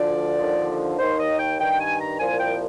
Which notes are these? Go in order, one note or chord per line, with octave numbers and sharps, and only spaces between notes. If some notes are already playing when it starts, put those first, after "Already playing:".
Already playing: D2 D3 F3 D5
D#2 D3 F3
D#2 D#3 C5
D#5
G5
G2 D#3 G5
G#5
A#5
C2 A#2 F3 G#5
G5